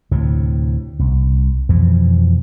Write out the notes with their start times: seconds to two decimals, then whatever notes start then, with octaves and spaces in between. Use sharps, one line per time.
0.11 D2 A2 C3
0.99 C2
1.69 F2 B2 E3 F3